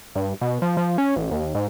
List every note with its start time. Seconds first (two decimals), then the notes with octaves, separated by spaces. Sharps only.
0.15 G2
0.41 B2
0.62 F3
0.77 F3
0.98 C#4
1.16 A1
1.31 D#2
1.55 G#2